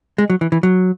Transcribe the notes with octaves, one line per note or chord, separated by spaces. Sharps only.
G#3
F#3
E3
E3
F#3